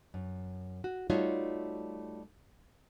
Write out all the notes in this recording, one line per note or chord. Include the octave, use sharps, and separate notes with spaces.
F#2
F#4
G3 A3 D#4 F4 F#4 C#5